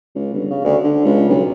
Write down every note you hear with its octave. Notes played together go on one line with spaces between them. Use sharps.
C#2
G1
C#3
D2
D3
C#2
B1